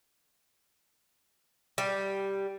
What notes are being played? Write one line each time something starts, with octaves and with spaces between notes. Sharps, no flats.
G3